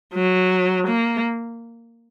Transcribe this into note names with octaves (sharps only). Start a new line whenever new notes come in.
F#3
A#3